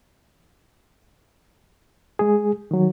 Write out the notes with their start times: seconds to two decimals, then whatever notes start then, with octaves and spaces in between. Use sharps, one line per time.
2.19 G#3 G#4
2.71 D#3 F#3